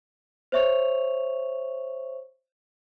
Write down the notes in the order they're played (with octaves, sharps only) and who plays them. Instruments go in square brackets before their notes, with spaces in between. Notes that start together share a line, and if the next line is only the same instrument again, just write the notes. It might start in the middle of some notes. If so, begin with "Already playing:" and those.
[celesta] C5 C#5 E5 C#6 F7